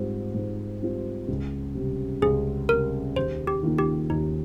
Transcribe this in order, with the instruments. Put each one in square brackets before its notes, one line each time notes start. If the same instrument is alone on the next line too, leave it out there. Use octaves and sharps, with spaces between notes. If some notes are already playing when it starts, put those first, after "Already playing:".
Already playing: [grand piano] G#2 G3 C4 F4
G#2
G3 C4 F4
C#2
C3 G3
[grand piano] C#2 [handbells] G#4
[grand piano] C3 G3 [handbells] A#4
[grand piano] D#2 [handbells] C5
[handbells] G4
[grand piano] D#3 A#3 F4
[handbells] G4
[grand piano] D#2 [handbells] D#4